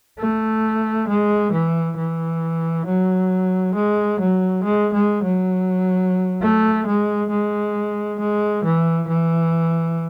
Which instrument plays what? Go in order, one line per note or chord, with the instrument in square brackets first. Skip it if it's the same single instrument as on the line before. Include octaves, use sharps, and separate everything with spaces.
[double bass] A3
G#3
E3
E3
F#3
G#3
F#3
G#3
G#3
F#3
A3
G#3
G#3
G#3
E3
E3